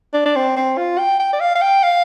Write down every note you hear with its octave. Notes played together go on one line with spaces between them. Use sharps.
D4
D4
C4
C4
F4
G5
G5
D5
F5
F5
G5
F5